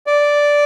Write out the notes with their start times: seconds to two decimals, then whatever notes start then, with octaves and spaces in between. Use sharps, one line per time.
0.07 D5